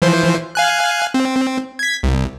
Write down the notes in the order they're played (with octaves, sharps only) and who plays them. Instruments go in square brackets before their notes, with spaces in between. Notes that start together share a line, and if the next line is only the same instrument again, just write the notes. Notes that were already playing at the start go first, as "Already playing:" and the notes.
[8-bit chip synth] E3 F3 C5
F5 G#5 F#6
C4
G#6 B6
C2